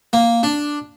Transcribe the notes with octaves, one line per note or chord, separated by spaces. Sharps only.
A#3
D4